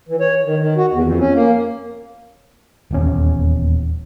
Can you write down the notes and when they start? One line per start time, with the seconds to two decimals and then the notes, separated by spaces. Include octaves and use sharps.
0.09 E3
0.20 C#5
0.44 D#3
0.59 D#3
0.77 F#4
0.92 E2
1.04 F2
1.20 C#4
1.34 A#3
2.91 D#1 E2 C#4